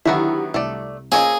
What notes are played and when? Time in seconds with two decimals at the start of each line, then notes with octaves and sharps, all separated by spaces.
0.05 D3 D#3 F#3 B3 E4 F#4 G4 E5
0.54 C2 A3 D5
1.12 A#3 C4 C#4 F4 G#4 C#5 D#5